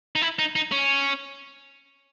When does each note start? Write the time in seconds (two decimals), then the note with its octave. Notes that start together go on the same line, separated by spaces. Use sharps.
0.15 D#4
0.22 E4
0.39 D#4
0.56 D#4
0.72 C#4